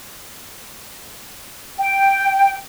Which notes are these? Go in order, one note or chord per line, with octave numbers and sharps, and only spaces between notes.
G5